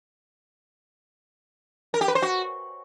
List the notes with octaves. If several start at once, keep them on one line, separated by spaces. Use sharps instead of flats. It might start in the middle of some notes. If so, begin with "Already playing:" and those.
A#4
G4
B4
C5
F#4